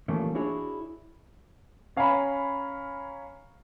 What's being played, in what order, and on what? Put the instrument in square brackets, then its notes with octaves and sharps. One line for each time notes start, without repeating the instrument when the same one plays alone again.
[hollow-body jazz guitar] E3 F3 G3 A3 A#3 C#4
D4 E4 F#4 G#4 C#5
[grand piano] C#4 F5 G#5 A#5 B5